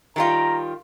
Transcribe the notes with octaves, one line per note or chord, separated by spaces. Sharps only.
D#3 G3 F4 A#5